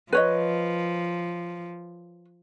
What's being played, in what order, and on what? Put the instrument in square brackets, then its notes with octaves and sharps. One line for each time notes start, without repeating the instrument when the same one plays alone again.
[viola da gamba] F3 [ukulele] B4 C#5 D#5